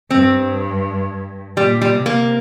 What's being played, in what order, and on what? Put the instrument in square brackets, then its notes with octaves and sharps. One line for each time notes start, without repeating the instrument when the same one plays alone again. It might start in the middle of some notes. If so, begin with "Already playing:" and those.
[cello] G2 [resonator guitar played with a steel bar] C4
[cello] A#2 [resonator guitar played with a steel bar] G3
[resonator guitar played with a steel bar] G3
[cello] C3
[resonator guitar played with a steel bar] A#3